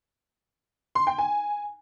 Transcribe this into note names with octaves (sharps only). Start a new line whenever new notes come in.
C6
G5
G#5